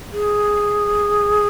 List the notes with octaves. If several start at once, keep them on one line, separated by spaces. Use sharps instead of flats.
G#4